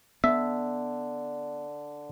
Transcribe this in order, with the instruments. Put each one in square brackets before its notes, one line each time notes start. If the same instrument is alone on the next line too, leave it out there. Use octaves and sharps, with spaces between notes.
[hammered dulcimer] D3 [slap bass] B3 [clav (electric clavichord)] E5